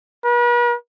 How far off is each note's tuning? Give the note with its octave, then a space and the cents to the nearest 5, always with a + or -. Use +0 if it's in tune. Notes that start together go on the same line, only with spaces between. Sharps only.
B4 -45